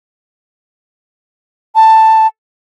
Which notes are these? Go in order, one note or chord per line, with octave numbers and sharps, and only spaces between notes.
A5